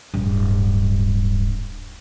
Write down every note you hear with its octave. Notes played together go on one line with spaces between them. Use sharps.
D1 G2